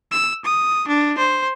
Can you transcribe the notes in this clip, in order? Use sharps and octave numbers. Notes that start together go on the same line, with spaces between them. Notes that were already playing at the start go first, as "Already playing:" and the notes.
E6
D#6
D4
C5